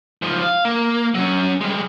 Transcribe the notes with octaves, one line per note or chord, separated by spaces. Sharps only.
G#2 F3
F5
A#3
F#3 C#4
G3 G#3